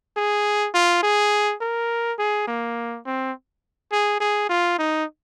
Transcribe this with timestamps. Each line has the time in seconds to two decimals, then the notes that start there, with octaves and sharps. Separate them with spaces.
0.17 G#4
0.74 F4
1.03 G#4
1.61 A#4
2.19 G#4
2.47 A#3
3.06 C4
3.92 G#4
4.20 G#4
4.49 F4
4.78 D#4